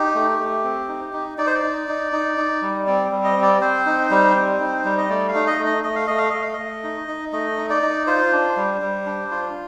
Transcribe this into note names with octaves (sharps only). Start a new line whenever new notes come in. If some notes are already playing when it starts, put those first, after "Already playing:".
Already playing: D#4 G4
A3
A3
C4
D#4
D#4
D#4 D5
C5
D5
D#4
D#4
D#4
D#4
G3
C4 D5
G3
D#5
C4
D5
C4 C5
D#4
G3
C4
D#4
G3
D#5
A3 D5
F5
D#4
D#5
A3
D#5
A3 D#5
F5
A3 D#5
F5
A3 D#5
F5
D#5
A3
D#4
D#4
A3 D#5
D#4
D5
D#4
F4 C5
D4
G3
G3
D4
F4